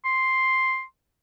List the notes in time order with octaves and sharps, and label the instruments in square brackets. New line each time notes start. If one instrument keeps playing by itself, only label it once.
[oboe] C6